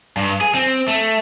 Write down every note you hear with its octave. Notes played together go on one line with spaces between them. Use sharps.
G2
G#4
C4
A3